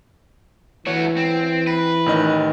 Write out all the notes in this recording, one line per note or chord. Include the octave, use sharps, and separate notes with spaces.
E3 A3 F#4 C#5
C4
B4
A1 D#3 D#5